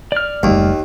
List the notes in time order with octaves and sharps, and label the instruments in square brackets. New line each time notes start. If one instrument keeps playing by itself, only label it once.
[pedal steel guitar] D5 F6
[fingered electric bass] F#1 G3 A3 [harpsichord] D#2